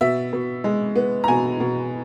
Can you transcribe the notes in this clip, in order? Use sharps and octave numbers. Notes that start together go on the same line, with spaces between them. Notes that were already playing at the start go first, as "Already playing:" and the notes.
B2 E5
B2
G#3
B3
A#5
B2 G#5
B2